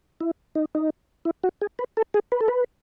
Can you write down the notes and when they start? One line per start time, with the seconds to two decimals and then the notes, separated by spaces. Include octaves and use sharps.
0.20 E4
0.55 D#4
0.75 D#4
1.25 E4
1.43 F#4
1.62 G#4
1.79 B4
1.97 A4
2.14 G#4
2.32 B4
2.41 A4
2.48 B4